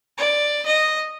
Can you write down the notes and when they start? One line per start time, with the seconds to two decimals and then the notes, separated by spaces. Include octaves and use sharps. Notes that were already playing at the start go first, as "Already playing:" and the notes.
0.18 D5
0.66 D#5